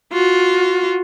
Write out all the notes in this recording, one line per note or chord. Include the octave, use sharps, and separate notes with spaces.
F4 F#4